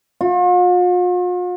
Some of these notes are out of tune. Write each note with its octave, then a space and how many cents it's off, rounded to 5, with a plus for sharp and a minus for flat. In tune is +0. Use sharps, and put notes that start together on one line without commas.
F4 +45